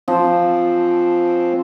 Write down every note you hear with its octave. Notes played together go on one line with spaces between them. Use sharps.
F3 C4